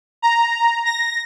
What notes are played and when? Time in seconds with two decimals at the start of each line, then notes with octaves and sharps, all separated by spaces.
0.22 A#5
0.85 A#6